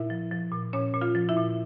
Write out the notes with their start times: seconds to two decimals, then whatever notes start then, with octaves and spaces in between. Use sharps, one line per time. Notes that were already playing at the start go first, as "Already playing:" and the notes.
Already playing: A#2 E4 E5
0.10 F3
0.32 F3
0.52 A#2
0.73 A#2 C#4 C#5
0.94 A#2
1.01 F4 F5
1.15 F3
1.29 E4 E5
1.37 A#2